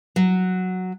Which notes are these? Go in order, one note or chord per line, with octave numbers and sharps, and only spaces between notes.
F#3